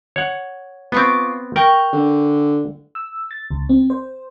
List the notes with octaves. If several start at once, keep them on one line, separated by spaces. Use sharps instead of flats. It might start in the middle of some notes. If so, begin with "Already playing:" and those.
C#5 F#5
B3 C4 F4 C#6 D6
A#4 G5 A#5 C#6
D3
E6
A6
C#2
C4
C5